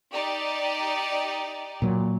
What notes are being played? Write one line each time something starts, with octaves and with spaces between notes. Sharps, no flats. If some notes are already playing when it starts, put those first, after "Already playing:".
D#4 G4 D5
A#2 F#3